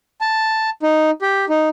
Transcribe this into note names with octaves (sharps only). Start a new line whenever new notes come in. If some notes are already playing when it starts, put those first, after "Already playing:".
A5
D#4
G4
D#4